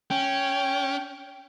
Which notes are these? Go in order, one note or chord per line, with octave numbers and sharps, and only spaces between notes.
C#4 G5